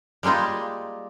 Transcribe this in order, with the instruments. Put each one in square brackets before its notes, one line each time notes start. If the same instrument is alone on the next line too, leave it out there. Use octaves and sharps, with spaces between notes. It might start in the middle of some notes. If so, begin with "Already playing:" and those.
[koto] G3 G#3 A#3 D#4 F4